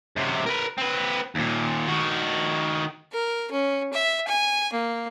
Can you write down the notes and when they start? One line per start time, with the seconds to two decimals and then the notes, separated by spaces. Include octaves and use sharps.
0.16 F#2 C3
0.46 A#4 B4
0.78 C4 B4
1.35 D#2 A#2
1.87 D#3 F#4
3.12 A#4
3.51 C#4
3.93 E5
4.27 G#5
4.72 A#3